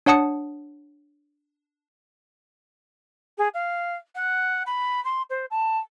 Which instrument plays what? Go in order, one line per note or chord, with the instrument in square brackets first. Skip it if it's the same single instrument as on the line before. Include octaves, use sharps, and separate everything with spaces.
[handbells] D4 C#5 F#5 A5 D#6 C#7
[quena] G#4
F5
F#5
B5
C6
C5
A5